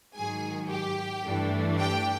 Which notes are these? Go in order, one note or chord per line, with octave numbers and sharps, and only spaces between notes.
G#2 D#3 F#3 G#4 G#5
G4 G5
G2 E3 A3 D4
G4 G5